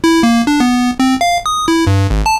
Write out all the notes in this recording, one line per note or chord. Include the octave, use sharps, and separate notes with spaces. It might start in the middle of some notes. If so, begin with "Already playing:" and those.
E4
A#3
D4
B3
C4
F5
D#6
E4
G2
G#1
A5